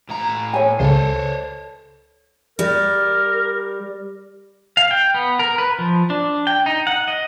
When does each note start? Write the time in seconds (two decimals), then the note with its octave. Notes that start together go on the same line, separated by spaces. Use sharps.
0.09 A2 A#5
0.54 C#5 G#5
0.80 C#2 A4 C5 C#5
2.59 G3 A#4
4.77 F5
4.91 G5
5.14 B3
5.39 A#4
5.58 B4
5.79 F3
6.10 D4
6.47 G5
6.66 D#4
6.87 F#5
7.08 D#5